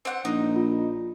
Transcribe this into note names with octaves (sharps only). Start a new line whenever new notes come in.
C4 F#5
A#1 D#4 D#6
F4